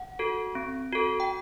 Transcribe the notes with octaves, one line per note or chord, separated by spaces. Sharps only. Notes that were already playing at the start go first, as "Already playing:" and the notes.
Already playing: F#5
F#4 A4
C4
F#4 A4
G5